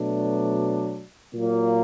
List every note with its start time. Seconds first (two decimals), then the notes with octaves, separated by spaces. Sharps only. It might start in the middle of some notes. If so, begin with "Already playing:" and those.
Already playing: B2 F#3 A3 D4
1.33 A#2 F#3 A#3